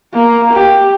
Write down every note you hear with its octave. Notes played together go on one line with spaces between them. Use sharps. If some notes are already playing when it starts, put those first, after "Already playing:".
A#3
G4